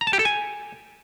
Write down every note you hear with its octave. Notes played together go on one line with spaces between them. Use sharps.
A#5
A5
G4
A4
G#5